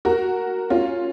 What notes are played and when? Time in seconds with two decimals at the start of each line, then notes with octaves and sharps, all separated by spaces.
0.05 F#4 A#4
0.70 C#4 F4